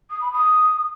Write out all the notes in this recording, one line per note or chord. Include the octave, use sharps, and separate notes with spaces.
D#6
B5
D#6